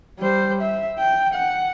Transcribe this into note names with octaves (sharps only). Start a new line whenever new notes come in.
G3 C5
E5
G5
F#5